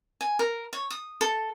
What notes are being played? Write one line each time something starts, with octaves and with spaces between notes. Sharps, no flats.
G#5
A#4
C#5
D#6
A4